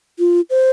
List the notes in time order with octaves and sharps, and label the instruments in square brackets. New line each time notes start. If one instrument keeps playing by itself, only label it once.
[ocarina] F4
C5